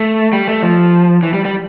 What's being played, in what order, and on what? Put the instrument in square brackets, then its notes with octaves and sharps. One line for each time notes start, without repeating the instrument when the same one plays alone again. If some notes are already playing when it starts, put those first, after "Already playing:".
Already playing: [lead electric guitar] A3
G3
A3
F3
E3
G3
G3